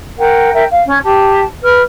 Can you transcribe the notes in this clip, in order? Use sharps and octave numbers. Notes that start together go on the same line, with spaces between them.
A#4 F#5 G5
A#4 E5 G5
F5
C#4
G4 A5
B4 F6